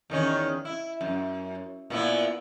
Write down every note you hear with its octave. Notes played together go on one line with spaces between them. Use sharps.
E2 D#3 C#4
E4
F#2
A#2 B3 E4